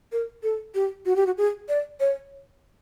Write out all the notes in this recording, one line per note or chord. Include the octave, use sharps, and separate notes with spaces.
A#4
A4
G4
F#4
G4
F#4
G#4
D5
C#5